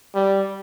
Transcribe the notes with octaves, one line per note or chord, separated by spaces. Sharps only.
G3